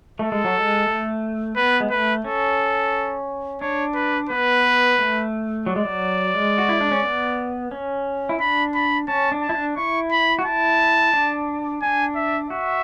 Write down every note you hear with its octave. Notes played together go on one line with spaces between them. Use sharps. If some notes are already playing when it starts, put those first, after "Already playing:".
A3 A4
G#3
F#3
G#3
A3
B3 B4
G#3
A3 B4
C#4 A4
D4 C#5
B4
B3 B4
A3
F#3 D5
G#3
F#3
G#3
F#4
E4
D4
C#4
B3
C#4
E4
D4 B5
B5
C#4 A5
D4
A5
E4
D4
E4 C#6
B5
F#4
E4 A5
D4
D4 G#5
E5
F#4 E5